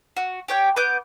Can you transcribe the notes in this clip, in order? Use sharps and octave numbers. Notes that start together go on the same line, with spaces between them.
F#4
G4 C#5 G5
B3 D6 G6